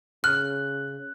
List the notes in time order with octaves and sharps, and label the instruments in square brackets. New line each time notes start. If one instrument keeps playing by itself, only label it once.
[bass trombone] C#3 [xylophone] F6 [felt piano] F#6